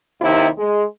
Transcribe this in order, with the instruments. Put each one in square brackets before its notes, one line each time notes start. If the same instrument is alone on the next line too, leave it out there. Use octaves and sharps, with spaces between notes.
[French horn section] D#2 C3 D#3 E4
G#3